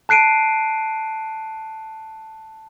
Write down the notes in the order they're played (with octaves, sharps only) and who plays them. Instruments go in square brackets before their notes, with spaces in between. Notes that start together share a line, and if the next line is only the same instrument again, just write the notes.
[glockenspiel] A5 F#6 C7 D7 D#7